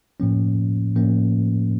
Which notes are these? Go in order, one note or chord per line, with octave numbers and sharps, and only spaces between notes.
A2 F3 A#3 C#4
A2 F3 A#3 C#4